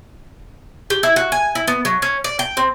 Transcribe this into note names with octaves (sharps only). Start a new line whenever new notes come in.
G4
E4
F#4
G#5
E4
B3
F#3
C#4
D5
G5
C4